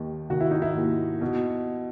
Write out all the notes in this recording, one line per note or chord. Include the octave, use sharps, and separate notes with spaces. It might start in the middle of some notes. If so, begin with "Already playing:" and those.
Already playing: D#2 D#3
D#3 F#4
E4
D#4
E4
D#2
B2